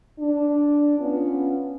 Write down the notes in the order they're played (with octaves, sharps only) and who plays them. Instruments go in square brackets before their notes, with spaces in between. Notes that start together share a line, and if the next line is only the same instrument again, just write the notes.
[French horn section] D4
B3 C#4 F4